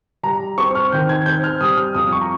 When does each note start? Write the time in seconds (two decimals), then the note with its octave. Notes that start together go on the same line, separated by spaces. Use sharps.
0.23 G3 A#5
0.58 C4 C#6
0.75 F6
0.92 D#3 G6
1.09 G#6
1.26 C4 G6
1.44 F6
1.61 G3 D#6
1.77 F6
1.95 F2 D#6
2.12 C#6
2.21 A#5